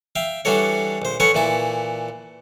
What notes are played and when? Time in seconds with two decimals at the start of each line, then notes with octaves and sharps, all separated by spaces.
0.16 E5 F5 G5
0.45 E3 G3 D4 F#4 A4 C#5
1.02 A#1 C5
1.20 C#4 A4 B4 C#5 F#5 C#6
1.35 A#2 E3 E4 A5